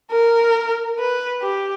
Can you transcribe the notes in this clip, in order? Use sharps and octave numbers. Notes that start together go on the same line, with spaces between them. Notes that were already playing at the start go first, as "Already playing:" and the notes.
A#4
B4
G4